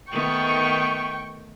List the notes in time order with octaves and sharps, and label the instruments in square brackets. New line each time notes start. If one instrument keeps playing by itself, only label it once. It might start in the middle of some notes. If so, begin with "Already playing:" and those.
[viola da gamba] D#3 A3 B3 [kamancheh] G5 C#6